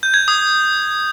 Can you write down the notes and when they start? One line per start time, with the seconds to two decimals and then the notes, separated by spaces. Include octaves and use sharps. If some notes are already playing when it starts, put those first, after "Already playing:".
0.03 G6
0.14 G#6
0.28 D#6